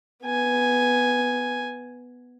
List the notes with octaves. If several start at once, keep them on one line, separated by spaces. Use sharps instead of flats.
B3 G#5